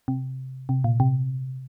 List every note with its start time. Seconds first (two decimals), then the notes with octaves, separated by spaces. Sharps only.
0.08 C3
0.69 C3
0.84 A#2
1.00 C3